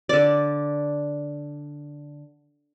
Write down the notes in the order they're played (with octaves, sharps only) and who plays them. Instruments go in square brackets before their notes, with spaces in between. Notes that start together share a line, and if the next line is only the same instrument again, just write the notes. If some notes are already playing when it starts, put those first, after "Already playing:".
[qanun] D3 D5